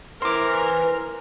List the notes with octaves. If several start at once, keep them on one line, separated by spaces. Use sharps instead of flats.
E3 A#4 C5 D6